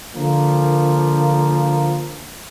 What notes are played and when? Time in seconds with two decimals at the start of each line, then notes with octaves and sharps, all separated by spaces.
0.15 D3 F3 A#3